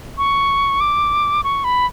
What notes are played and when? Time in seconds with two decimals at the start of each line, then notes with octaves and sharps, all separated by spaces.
0.18 C#6
0.81 D6
1.44 C#6
1.64 B5